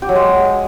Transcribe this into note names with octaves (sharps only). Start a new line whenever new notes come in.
G4
F#3
G#3